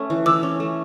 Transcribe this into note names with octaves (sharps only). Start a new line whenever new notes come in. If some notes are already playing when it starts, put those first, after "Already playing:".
Already playing: A3 C#4
E3
E3 D6 E6
C#4
A3